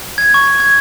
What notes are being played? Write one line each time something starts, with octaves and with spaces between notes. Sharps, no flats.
G#6
C#6
G#6